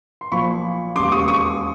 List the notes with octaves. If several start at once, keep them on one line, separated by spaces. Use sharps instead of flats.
C6
B1 A#2 F3 B5 C#6
E1 D#2 C#3 C6 D6
C#6 D#6
C#6 D#6